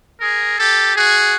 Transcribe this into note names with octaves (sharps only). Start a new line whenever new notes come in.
G#4 A#4
G4 A4
F#4 G#4